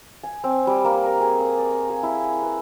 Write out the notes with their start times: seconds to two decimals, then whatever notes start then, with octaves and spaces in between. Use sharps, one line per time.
0.23 G#5
0.44 C4
0.67 G3
0.85 A#3
1.06 A#4
1.21 G#4
1.41 D#6
1.58 D5
1.90 G#4
2.03 E4
2.43 B4